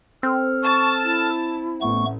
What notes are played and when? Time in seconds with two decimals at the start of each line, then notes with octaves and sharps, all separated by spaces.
0.23 C4 A4 F6
0.63 A5 C#6
1.04 E4
1.82 A1 A3 B3 C#6